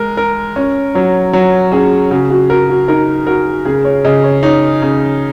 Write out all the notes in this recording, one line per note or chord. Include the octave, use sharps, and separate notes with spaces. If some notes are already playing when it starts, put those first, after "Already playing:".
Already playing: G#3 A#4
A#4
C#4 C#5
F#3 C#5
F#3 C#5
C#4 G#4
C#3 F#4
F#4
F#4 A#4
F#4
D#4 A#4
F#4 A#4
C#3 G#4
C#5
C#3 D#5
C#5
D#4 C#5
C#3